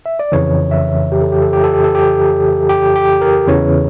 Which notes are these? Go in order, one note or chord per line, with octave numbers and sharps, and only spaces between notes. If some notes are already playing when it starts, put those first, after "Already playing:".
E5
D5
F2 C#3 E3 C#5
E5
G4
A4
G4
A4
G4
A4
G4
A4
G4
G4
G4
A#4
E2 C#3 E3 C#5